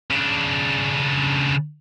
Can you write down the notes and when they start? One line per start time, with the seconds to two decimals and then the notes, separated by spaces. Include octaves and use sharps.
0.11 C#3 D4